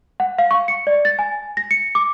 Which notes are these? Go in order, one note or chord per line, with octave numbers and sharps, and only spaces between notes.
F#5
F5
C#6
C#7
D5
A6
G#5
A#6
C#7
D6